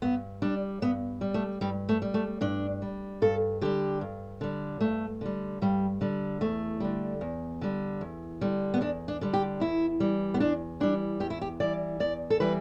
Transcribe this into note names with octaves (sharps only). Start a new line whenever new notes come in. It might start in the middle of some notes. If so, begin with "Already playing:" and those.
G2 B3
G3 D4
G2 B3
G3
A3
G2 G3
A3
G3
A3
G2 D4
G3
G2 A4
D3 G3 G4
G2
D3 G3
G2 A3
D3 G3
G2 G3
D3 G3
E2 A3
D3 G3
E2
D3 G3
E2
D3 G3
B3
E2 D4
D4
D3 G3
G4
E2 E4
E3 G3
B3
E2 D4
E3 G3 D4
E2 G4
E4
G4
E3 G3 D5
E2 D5
A4
E3 G3 B4